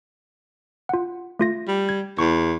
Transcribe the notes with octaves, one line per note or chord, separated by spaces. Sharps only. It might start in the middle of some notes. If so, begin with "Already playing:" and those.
F4 F#5
A3 F4 A#6
G3
G#6
E2 C#6